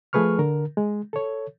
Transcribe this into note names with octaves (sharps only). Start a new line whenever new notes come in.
F3 A3 G#4 B4 C#6 F6
D3 A#4
G#3
A4 C#5